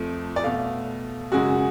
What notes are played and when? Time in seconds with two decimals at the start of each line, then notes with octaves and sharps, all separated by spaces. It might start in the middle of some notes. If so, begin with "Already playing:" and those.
Already playing: F2 F3 A3
0.36 D5
0.44 B2 A3 F5
1.32 F#2 C#3 G#3 F#4